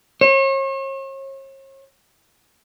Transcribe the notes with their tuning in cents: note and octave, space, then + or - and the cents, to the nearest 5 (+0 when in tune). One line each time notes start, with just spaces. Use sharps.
C#5 -40